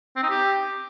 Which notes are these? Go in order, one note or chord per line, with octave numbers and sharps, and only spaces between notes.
C4
D#4
G4